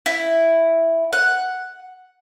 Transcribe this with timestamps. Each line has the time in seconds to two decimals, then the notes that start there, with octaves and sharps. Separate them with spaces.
0.06 E4
1.13 F#5